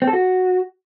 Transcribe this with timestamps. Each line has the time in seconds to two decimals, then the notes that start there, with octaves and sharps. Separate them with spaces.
0.02 C4
0.07 A4
0.13 F#4